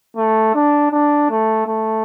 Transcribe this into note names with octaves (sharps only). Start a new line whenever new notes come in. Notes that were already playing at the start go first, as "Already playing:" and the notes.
A3
D4
D4
A3
A3